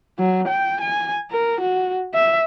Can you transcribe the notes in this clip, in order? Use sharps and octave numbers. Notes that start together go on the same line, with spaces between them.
F#3
G5
G#5
A#4
F#4
E5